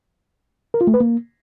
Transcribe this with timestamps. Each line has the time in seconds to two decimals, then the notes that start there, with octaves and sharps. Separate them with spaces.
0.74 A#4
0.81 F4
0.87 A3
0.94 B4
1.00 A#3